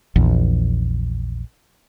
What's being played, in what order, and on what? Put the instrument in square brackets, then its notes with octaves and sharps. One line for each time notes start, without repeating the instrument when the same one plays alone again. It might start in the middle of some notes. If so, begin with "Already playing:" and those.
[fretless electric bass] A#1 E2